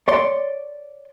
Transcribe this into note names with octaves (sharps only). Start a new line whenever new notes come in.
C#5 D5 C6